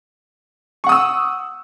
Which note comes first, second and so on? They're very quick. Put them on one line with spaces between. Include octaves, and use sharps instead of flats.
C#6 F#5 D#6 E6